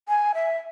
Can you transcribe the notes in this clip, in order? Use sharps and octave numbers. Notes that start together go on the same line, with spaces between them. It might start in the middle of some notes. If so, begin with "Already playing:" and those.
G#5
E5